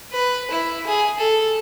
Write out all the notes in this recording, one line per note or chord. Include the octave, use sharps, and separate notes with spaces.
B4
E4
G#4
A4